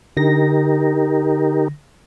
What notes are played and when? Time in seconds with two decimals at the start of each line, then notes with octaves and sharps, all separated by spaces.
0.17 D3 D#4 G4 A#4 A#6